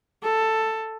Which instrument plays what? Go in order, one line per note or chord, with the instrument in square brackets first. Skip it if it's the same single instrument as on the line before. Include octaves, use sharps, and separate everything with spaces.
[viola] A4